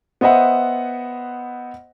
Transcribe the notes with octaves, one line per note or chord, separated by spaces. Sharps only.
B3 C5 D#5 E5 F#5